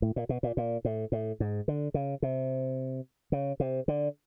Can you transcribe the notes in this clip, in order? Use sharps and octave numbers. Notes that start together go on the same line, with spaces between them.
A2
A#2
B2
A#2
A#2
A2
A2
G#2
D3
C#3
C3
C#3
C3
D3